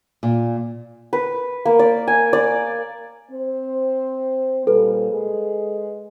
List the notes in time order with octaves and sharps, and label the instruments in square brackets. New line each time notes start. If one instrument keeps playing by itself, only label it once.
[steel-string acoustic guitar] A#2
[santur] B4
A#3
D5
G#5
D5
[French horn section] C4 C5
[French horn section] A#2 G3 [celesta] A4 B4
[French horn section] G#3 G#4